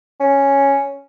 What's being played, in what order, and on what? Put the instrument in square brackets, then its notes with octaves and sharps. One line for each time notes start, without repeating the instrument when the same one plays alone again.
[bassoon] C#4